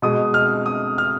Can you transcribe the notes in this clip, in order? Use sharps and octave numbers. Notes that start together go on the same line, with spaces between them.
B2 G#3 D#6
F6
D#6
F6